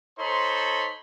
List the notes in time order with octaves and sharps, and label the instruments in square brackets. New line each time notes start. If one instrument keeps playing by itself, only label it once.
[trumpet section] D#4 A4 C5 C#5 B5 C6